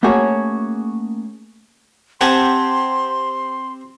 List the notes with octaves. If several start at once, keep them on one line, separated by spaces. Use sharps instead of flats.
A3 A#3 C#4 F#4 G#4 C#5
C4 G4 F#5 G#5 A5 C6